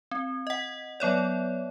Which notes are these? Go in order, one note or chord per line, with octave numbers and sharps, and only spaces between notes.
C4
D#5 F#5
F#3 B3 C#5 D5